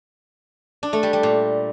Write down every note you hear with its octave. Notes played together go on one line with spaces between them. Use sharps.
D4
A3
G3
G3
A#2